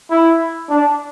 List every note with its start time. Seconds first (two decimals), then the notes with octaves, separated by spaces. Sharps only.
0.11 E4
0.70 D4